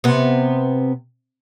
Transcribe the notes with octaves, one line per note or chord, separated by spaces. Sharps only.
C3 B3